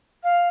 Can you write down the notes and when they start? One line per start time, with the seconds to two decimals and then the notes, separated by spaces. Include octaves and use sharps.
0.23 F5